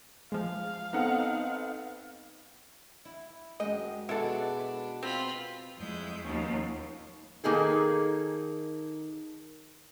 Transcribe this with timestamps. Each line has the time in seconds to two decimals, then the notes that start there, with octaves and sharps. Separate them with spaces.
0.32 F3 G#3 F5
0.93 B3 C4 D#4 A4 F#5
3.05 E4
3.60 F#2 G#3 D#5 G5
4.09 B2 G#3 D4 E4 F#4 G#4 A4 F#5
4.59 B4
5.03 C4 F4 B5
5.76 F2 G#3 E4 G6
6.23 D#2 B2 F3 C#4
7.44 D#3 A#3 D#4 G#4 A4